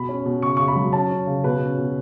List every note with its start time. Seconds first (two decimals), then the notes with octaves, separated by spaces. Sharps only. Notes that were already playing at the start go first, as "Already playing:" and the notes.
Already playing: B2 B5
0.09 C#4
0.26 B2
0.42 C#3 C#6
0.57 C#3 C#6
0.68 B5
0.76 F#3
0.93 C#4 A5
1.11 C#4
1.27 C#3
1.44 B2 B4
1.61 C#4
1.78 B2